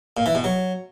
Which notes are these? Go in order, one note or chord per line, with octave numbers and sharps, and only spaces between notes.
A#2
E3
B2
F#3